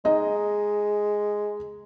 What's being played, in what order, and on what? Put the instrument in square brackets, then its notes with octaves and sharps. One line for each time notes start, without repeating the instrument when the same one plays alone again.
[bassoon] G#3 [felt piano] D#4 D#5